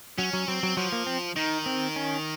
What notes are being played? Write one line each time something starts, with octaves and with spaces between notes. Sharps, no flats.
F#3 C#4
F#3
F#3 C4
F#3
F3 F#3
A#3
C4
D#3 D#4
C4
C#4